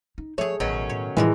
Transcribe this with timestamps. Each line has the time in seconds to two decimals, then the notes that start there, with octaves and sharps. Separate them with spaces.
0.18 D#4
0.38 F3 A3 G#4 C#5
0.60 A1 B2 D#3 F#3 C#4
0.90 A2 C#5
1.17 A2 E3 F3 G#3 A#4